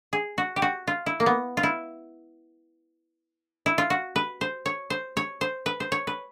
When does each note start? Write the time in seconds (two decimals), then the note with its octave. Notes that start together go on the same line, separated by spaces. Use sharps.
0.13 G#4
0.38 F#4
0.56 G4
0.62 F#4
0.87 F4
1.06 E4
1.20 A#3
1.26 B3
1.57 F4
1.63 E4
3.66 E4
3.78 F4
3.90 F#4
4.16 B4
4.41 C5
4.66 C#5
4.90 C5
5.17 C#5
5.41 C5
5.66 B4
5.80 C5
5.92 C#5
6.07 B4